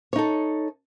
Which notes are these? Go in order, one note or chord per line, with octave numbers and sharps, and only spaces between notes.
D#4 A4 C#5